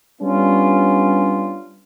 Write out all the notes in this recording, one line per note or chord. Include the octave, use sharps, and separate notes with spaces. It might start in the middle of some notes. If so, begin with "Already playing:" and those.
G3 B3 C#4 D4 F4